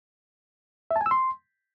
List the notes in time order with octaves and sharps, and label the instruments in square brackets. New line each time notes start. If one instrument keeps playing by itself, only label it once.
[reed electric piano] E5
A5
G#5
E6
C6